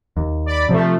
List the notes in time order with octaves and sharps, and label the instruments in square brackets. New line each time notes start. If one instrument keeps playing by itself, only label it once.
[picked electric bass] D#2
[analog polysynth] D5 B5
[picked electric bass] C3 [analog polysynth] F3 A3